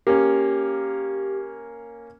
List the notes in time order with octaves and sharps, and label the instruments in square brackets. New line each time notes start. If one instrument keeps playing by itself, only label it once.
[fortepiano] A#3 C#4 [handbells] G4